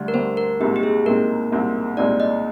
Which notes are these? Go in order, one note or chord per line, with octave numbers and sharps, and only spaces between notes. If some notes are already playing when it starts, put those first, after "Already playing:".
Already playing: D2 D3 G3
A#4
D2 D3 G3 C5
A#4
C2 A#2 G#3 C4 D#4 G4
G4
G#4
C2 A#2 G#3 C4 D#4 A#4
C2 A#2 G#3 C4 D#4
C2 A#2 G#3 C4 D#4 D5
D#5